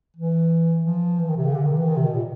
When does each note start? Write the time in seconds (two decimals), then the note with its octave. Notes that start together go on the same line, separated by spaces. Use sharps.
0.17 E3
0.86 F3
1.20 E3
1.28 D#3
1.37 C3
1.46 C#3
1.54 D3
1.66 D#3
1.77 E3
1.89 D#3
1.97 C3
2.06 B2
2.15 A#2